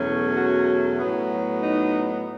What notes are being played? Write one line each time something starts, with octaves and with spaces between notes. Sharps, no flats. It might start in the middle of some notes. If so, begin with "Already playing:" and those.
Already playing: E2 B2 F#3 A3 C#4
F#4
A2 F#3 B3
D#4